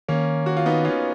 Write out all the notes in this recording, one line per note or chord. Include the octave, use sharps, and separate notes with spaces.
D#3 A#3 C#4
F#4
F4
B3 D#4
C#4 F4